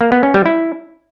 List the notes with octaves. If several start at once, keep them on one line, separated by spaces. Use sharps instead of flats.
A#3
B3
C#4
G3
E4